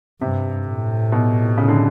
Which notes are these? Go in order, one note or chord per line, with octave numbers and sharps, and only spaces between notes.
G2 C3
A2
B2
C#3
D3